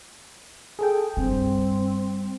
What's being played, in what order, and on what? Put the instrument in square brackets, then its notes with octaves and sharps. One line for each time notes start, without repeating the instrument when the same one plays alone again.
[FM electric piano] G#4 A4 G5
[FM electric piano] G2 [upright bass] G3 [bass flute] C4